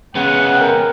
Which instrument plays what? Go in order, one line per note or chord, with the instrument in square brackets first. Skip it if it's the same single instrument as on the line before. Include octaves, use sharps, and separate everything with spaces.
[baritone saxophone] C#3 [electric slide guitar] G#3 B3 [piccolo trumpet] F#5
[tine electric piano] A#4 G5